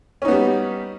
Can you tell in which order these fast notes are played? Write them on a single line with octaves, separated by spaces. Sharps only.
C#4 D#4 B3 G3